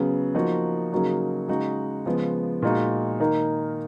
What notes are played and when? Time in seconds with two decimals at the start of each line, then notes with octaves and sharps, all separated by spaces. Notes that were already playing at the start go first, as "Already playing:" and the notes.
Already playing: C#3 F#3 B3
0.34 F3 A#3 D#4 F#4
0.92 C#3 F#3 A#3 D#4 F#4
1.48 C#3 G#3 D#4 F#4
2.06 C#3 F3 G#3 B3
2.62 A#2 G#3 D#4 F#4
3.20 D#3 A#3 D#4